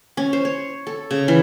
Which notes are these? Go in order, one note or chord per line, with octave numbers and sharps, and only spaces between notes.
C#4
C5
C#5
A4
C#3
E3